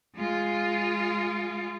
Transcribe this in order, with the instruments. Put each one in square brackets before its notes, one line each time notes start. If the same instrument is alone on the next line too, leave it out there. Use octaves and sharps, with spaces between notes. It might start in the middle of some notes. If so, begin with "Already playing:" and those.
[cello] G#3 F4